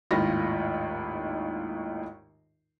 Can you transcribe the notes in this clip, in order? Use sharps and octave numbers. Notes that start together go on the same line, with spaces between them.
G#1 D#2 A2 F4 B5 A#6